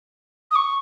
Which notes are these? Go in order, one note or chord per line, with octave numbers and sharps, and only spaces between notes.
D#6
C#6